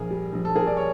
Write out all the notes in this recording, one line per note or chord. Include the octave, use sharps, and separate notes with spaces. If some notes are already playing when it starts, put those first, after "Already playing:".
Already playing: A#1 A#2 G#4 A#4
G3
A#1
A4
A#2 G#4 A#4
D5
C#5